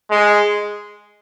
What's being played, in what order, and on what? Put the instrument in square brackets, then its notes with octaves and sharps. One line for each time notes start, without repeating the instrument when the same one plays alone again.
[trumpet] G#3